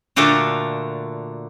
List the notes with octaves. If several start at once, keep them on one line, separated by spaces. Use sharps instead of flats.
A#2 D3 A3 D4 F4 F#4